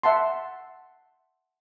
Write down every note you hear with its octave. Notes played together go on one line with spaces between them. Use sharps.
E5 F#5 A5 C6